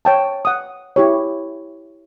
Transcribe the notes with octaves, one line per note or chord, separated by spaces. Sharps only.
C#5 G5 A5
F#5 D#6
E4 G4 C#5